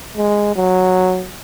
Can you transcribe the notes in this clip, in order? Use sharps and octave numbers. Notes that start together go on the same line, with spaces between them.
G#3
F#3